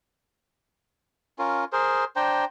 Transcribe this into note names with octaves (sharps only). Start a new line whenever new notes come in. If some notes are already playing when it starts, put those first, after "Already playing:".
C#4 F4 A#4
G#4 A#4 C5
D4 C5 G5 A#5